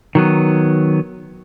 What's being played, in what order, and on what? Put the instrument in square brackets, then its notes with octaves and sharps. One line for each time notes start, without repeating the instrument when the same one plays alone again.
[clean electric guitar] D#3 F#3 B3